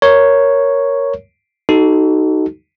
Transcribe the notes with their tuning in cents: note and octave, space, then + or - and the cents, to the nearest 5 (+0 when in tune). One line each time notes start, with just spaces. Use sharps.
A#4 +0 C#5 +0
D#4 +0 F#4 +35 A4 +0